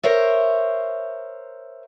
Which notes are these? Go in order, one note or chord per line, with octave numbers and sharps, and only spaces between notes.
A#4 C5 C#5 E5